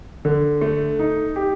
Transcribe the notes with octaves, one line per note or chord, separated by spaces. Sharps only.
D3
A3
D#4
G4